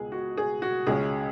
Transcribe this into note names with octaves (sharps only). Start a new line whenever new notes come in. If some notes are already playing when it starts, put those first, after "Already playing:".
Already playing: C#2 B2 G#3 B3 G#4
F#4
G#4
F#4
C#2 C#3 G#3 C#4 G#4